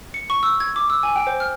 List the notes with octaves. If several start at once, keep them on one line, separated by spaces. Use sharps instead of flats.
C#7
C#6
E6
G#6
D6
E6
G#5
G5
C5
F6